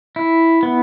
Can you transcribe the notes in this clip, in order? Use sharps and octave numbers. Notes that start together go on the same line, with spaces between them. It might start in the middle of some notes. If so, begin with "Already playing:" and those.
E4
B3